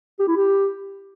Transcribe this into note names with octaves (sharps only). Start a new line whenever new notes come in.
G4
E4
G4